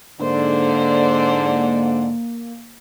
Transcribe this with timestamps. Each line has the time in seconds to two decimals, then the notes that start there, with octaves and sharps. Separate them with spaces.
0.21 G#2 D3 A#3 C5 D5